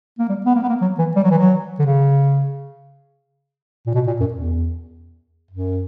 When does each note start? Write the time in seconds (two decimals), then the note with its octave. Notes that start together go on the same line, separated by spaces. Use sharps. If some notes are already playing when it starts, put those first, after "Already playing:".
0.19 A#3
0.29 G3
0.45 B3
0.55 A#3
0.63 B3
0.69 A#3
0.81 F#3
0.99 E3
1.16 G3
1.23 F#3
1.31 E3
1.38 F#3
1.79 D3
1.86 C#3
3.86 A#2
3.94 B2
4.07 A#2
4.20 F#2
4.33 E2
5.50 F#2